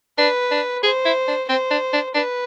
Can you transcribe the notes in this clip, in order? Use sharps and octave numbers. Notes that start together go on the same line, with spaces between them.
D4 B4
D4
G#4 C5
E4
D4
C4 C5
D4
D4
D4 B4